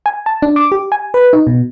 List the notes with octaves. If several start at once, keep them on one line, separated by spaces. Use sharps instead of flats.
G#5
A5
D4
D6
G4
G#5
B4
D#4
B2